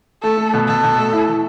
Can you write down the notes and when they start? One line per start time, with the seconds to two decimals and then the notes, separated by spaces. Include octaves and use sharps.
0.22 A3 A4
0.37 A3
0.53 B2
0.68 B2 A4
0.83 B2
0.97 A3
1.13 E4
1.27 E3